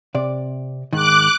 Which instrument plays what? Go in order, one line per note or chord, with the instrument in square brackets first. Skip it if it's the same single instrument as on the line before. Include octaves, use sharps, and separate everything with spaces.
[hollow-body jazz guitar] C3 D5
[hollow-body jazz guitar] G#2 D#3 [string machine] D6 F#6